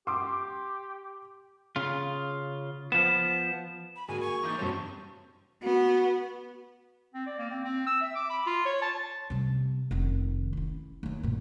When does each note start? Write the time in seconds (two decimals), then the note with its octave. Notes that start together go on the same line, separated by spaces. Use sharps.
0.07 G4 C6 D6
1.76 C#3 F4
2.92 F3 B3 E7
3.96 B5
4.08 G#2 D3 A#3 F#4 G#4 G#5
4.21 G#5 C#6
4.43 E3 A#3 D#4 D6 G6 A6
4.58 G2 C#3 F#3 G3 C4 C#4
5.63 B3 F#4
7.14 C4
7.27 D5
7.39 A#3
7.51 C4
7.64 C4
7.87 E6
8.01 E5
8.15 D6
8.30 B5
8.46 F4
8.66 C#5
8.82 A5
9.30 C3 G3
9.91 F1 D#3
10.53 C#4 E4
11.03 D#2 D#3
11.23 G2 A#2